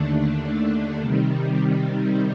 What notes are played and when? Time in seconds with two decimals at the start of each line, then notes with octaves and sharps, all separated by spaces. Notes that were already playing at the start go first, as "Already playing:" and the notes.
Already playing: D#2 D3 A3 D4
1.00 C3 D#3 G3